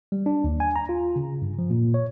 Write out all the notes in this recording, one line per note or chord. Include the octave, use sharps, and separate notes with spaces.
G3
D4
D#2
G#5
A#5
F4
C#3
G2
F3
A#2
C#5